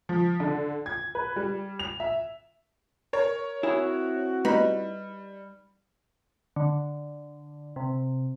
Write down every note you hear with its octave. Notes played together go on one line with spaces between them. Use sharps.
F3
D3
G#6
B4
G3
F7
E5
A#4 C#5
C4 E4 F#4 G#4
G3 D#4 B4 B5
D3
C3